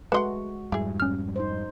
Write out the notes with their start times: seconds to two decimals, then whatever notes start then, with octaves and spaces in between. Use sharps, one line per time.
0.12 G#3 A3 F#4 B4 D#5 F#5 C6
0.72 F2 G#2 G3 E4 G#4
1.00 C#4 F6
1.36 D#4 C5